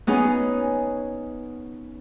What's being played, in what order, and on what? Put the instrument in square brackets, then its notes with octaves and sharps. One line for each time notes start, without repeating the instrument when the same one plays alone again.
[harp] B3 C#4 D#4 G#4